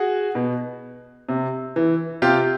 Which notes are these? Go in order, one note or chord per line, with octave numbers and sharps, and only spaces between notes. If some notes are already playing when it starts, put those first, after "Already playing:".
Already playing: F#4 G#4
B2
C3
E3
C3 F4 G4